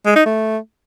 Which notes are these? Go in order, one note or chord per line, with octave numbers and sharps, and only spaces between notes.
G#3
D#4
A3